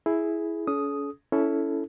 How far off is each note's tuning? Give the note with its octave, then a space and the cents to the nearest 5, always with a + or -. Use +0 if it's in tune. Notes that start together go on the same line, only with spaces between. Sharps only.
E4 +0 G#4 +10
C#4 +35 A4 -45 D#6 +0
C#4 +20 E4 +0 A4 +0